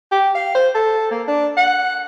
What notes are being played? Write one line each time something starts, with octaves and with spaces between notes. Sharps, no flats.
G4
F5
C5
A4
A#3
D4
F#5